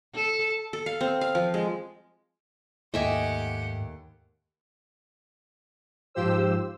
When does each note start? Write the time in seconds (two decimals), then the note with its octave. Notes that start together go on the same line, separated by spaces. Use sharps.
0.15 A4
0.73 A4
0.86 F5
1.01 C4
1.21 F5
1.35 F3
1.54 G#3
2.94 D#2 G#2 A3 G4 D#5 E5 F#5 G#5
6.14 G#2 F3 F4 G4 C5 E6